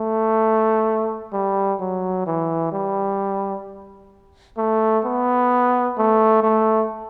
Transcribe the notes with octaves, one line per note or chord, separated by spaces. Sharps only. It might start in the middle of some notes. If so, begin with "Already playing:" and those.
Already playing: A3
G3
F#3
E3
G3
A3
B3
A3
A3